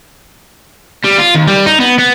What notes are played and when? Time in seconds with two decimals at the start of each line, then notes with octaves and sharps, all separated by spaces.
1.04 G3
1.18 F4
1.35 D#2
1.47 G3
1.66 D#4
1.80 B3
1.99 B3